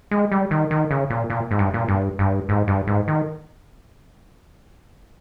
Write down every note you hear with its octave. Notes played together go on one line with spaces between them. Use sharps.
G#3
G3
D#3
D#3
C#3
A#2
A#2
G#2
G2
A#2
G2
G2
G#2
G2
G#2
D#3